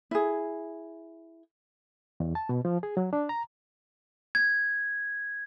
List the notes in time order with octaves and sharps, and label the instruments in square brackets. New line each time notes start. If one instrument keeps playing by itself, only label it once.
[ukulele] E4 G#4
[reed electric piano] E2
A5
B2
F3
G#4
F#3
D4
A#5
[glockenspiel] G#6